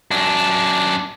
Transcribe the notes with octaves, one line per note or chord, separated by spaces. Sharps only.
F#2 D4